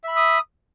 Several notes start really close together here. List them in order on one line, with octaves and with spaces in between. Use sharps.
E5 B5 E6 D#6